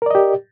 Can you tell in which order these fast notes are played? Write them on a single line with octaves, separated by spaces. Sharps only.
A#4 D5 D#5 G4